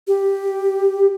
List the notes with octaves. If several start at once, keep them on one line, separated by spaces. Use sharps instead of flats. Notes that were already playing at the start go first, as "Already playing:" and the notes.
G4